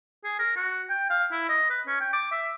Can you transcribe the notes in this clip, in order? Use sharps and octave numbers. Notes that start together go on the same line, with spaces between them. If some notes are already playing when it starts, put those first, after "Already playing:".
G#4
A#4
F#4
G5
F5
E4
D#5
B4
C#4
G5
D6
E5